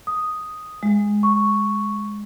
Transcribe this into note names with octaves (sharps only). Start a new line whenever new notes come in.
D#6
G#3
C#6